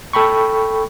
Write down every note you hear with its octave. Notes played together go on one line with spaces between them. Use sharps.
A4 G5 B5 C#6